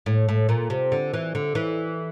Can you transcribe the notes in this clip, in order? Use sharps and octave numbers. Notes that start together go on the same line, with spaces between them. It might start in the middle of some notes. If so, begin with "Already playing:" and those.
A2
A2
A#2
C3
D3
E3
D3
E3